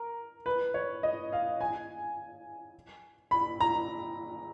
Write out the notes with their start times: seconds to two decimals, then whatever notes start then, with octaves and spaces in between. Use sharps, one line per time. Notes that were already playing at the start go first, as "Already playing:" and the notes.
Already playing: A#4
0.46 B4
0.74 C#5
1.03 D#5
1.33 F5
1.61 G#5
3.31 B5
3.60 A#5